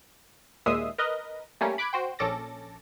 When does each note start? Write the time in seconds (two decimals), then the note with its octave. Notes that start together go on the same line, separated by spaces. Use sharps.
0.66 D#2 A#2 G#3 E5 D#6 C7
0.98 A#4 B4 D#5
1.61 G3 A3 A#3 C#4
1.78 B5 D6 F#6 G#6 B6
1.93 F#4 C5 G5
2.19 A#1 C#4 A4 D6 A6 A#6